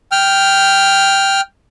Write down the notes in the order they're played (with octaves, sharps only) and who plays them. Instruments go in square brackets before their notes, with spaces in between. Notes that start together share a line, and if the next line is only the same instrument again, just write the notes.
[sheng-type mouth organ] G5 F6